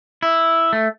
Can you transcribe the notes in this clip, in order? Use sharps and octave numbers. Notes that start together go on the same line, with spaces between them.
E4
A3